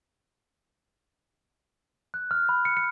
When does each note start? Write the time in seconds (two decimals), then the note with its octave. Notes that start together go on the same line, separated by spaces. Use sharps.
2.14 F#6
2.31 F6
2.49 B5
2.65 C#7
2.77 C#7